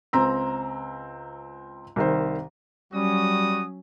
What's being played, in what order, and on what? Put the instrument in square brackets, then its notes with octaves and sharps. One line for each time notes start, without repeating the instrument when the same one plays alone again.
[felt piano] C#2 C4 A#5 E6
C2 D#3 C5
[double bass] F#3 C#4 [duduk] G3 [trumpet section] F#4 D#6